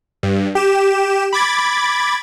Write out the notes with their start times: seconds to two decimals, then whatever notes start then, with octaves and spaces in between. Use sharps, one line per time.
0.23 G2
0.55 G4 E7
1.33 B5 D6 G#6 A6